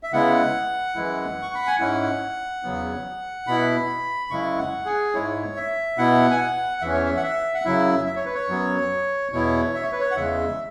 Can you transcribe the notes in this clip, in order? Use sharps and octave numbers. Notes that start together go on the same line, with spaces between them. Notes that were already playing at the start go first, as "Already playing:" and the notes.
E5
C#3 G#3 B3 E4 F#5
F#2 E3 G#3 E4
C#6
B5
G#5
G#2 G#3 C#4 E4 F#5
E2 C#3 F#3 B3
B2 B3 E4 B5
F#2 C#3 G#3 E4 C#6
F#5
G#4
G#2 G#3 E4 C#5
E5
B2 B3 E4 F#5
G#5
F#5
E2 E3 C#4 E5
C#5
E5
F#5
E5
F#5
F#2 C#3 F#3 E4 E5
E5
C#5
B4
C#5
F#2 F#3 B3
E2 B2 B3 E4 C#5
E5
C#5
B4
C#5
F#5
E2 C#3 G#3 E5